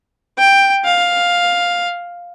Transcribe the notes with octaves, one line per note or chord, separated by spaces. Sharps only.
G5
F5